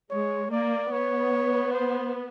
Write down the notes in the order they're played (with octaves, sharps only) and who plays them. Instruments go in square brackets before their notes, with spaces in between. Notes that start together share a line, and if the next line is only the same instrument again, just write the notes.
[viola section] G#3 [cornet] C#5
[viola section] A#3 [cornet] D5
[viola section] B3 [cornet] C#5
[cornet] C5